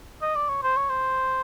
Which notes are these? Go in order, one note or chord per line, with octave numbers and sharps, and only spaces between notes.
D#5
D5
C#5
C5
C#5
C5